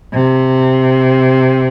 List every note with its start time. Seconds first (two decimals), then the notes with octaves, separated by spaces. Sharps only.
0.13 C3